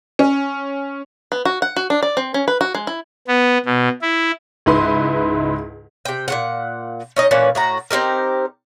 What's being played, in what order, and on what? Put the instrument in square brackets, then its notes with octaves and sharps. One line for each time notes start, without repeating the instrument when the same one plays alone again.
[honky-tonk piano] C#4
[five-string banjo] B3
F#4
F#5
F#4
D4
D5
C4
C#4
B4
F#4
G#3
E4
[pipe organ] B3
B2
E4
[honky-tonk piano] C#2 G#2 D#4 E4 B4 C6
[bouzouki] C3 G5
A#2 F#3 F#5
C#4 D#4 D#5
A#2 E3 C#4 B4
A2 F#4 A#5
C4 D#4 G4 A#4